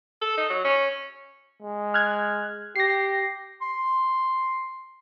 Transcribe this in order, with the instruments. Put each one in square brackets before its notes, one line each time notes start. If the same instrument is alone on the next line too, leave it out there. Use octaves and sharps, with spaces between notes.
[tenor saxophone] A4
D#4
F#3
C#4
[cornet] G#3
[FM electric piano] F6 F#6 G#6
[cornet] G4 [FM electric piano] A#6 C7
[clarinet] C6